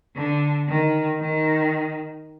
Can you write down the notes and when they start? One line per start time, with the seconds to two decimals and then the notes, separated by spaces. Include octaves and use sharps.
0.16 D3
0.68 D#3
1.20 D#3